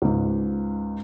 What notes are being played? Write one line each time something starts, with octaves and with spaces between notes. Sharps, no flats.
C#2 G#2